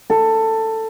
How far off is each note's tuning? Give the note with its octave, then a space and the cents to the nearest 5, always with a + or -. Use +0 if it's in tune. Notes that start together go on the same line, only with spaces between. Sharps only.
A4 +15